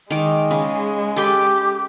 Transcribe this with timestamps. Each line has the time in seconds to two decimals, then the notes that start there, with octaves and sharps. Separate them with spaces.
0.10 D#3 G#3 D6
0.51 C#3
1.16 G4 A4 B4 G5